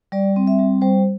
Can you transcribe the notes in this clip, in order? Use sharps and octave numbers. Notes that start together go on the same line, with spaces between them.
G3 D5
C4
E5
G3
G3 C5